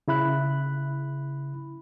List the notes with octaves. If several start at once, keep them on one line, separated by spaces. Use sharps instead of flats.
C#3 E4 B5 F#6